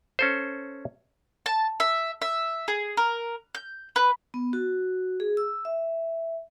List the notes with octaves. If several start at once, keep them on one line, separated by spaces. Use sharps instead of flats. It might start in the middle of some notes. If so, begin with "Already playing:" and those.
C#4 A4 C5
A5
E5
E5
G#4
A#4
G6
B4
B3
F#4
G#4
E6
E5